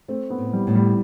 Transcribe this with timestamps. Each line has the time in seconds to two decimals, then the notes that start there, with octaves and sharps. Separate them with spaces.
0.08 A3 C4
0.30 B3
0.38 A2
0.53 G3
0.67 A2
0.75 G3